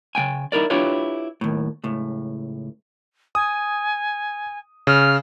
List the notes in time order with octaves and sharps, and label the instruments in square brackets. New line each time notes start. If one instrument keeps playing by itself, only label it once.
[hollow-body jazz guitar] C#3 A#3 G5 G#5
D#4 E4 A#4 D5
D4 E4 F4 G4 B4 C#5
D#2 A2
C#2 A2
[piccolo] G#5 [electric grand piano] D#6
[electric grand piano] C#3 [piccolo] F6